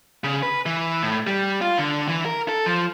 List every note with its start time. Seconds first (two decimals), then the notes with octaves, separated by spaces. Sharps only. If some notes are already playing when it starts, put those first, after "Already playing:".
0.24 C#3
0.43 B4
0.66 E3
1.02 A2
1.27 G3
1.61 F4
1.78 D3
2.08 E3
2.26 A#4
2.49 A4
2.66 F3